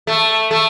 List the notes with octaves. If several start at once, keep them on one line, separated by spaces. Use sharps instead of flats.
A3
A3